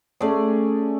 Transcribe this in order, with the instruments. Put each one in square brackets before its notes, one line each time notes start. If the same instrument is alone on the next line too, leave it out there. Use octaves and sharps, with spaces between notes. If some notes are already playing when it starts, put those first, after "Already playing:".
[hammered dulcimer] A3 C#4 G#4 D5